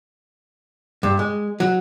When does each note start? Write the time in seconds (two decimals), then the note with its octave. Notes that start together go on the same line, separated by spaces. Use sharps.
1.03 G2
1.19 G#3
1.60 F#3